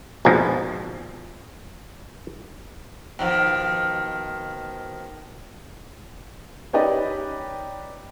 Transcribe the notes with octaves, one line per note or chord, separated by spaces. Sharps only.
A#1 F2 G#2 B2 F3
B2 D#3 F3
C#4 D#4 G4 B4 D5 D#5